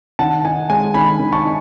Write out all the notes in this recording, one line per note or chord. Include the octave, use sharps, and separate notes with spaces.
D#3 F#5 A5
D#4 G#5
G#3 G#5
D#3 G#5 B5
D#3
A5 C#6
D#4